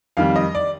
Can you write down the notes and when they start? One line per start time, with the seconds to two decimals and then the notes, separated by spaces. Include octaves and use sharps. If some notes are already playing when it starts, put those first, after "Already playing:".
0.17 F2 D#3 G3 F5
0.36 D#5
0.55 D5